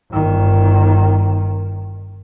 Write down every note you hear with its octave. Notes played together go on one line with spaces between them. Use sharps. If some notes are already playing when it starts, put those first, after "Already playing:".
G1 D#3